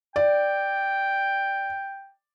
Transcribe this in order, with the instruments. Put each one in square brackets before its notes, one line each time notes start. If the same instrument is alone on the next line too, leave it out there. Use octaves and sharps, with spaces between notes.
[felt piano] D5 [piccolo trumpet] G5